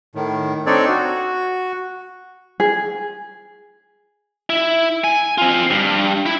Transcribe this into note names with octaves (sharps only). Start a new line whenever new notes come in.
A2 D#3
C4 D4 D#4 A4 C#5 D5
F#4
G#4
E4
G#5
C4 F4
G2
E4